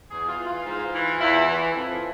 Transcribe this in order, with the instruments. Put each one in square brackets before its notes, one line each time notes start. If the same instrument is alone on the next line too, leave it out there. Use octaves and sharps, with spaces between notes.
[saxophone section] E2 G#4
F4
E3
F4
G#2
E3
E2 E4
E3
F2